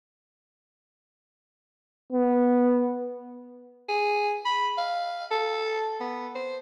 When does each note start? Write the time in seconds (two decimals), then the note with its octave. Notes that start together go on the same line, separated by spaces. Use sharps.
2.12 B3
3.89 G#4
4.45 B5
4.77 F5
5.31 A4
6.00 B3
6.35 C5